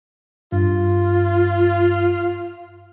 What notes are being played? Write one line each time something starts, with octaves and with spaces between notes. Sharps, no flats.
G2 F4